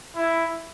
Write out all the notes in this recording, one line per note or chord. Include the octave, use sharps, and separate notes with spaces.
E4